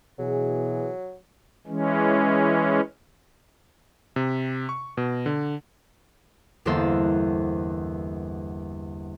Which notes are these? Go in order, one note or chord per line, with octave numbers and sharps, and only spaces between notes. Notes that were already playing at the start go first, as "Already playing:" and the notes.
B2 E3 F#3 G#4
E3 G#3 C#4
C3
C#6
B2
D3
G1 E2 A#3 A4 C5 E6